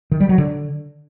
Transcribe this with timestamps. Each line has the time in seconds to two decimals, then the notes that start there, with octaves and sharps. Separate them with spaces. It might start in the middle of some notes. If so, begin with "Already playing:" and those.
0.12 D#3
0.20 G3
0.29 F#3
0.38 D3